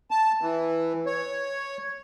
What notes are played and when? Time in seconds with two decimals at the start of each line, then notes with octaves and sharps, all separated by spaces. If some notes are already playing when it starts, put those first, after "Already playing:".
0.11 A5
0.41 E3
1.06 C#5